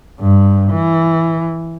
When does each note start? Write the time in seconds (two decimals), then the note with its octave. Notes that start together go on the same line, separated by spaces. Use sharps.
0.20 G2
0.71 E3